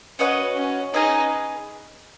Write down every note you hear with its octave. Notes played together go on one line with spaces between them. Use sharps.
C#4 F#4 B4 D#5 F#5
C#4
C#4 D#4 G#4 B4 D#5